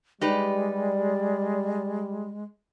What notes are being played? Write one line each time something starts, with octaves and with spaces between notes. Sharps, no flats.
G3 G#3 D#4 G4 B4 D5